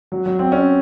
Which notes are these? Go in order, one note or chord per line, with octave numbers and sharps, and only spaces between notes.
F#3
F#3
C4
C#4